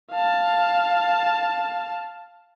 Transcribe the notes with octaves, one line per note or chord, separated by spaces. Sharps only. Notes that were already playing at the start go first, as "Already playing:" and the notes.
F5 A5